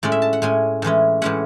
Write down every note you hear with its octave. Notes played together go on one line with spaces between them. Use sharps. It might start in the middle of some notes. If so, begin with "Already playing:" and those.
A2 G#3 C#4 D5
E5
A5
F#5
A2 G#3 C#4 G#5
A2 E3 G#3 C#4
A2 E3 G#3 C#4 F#5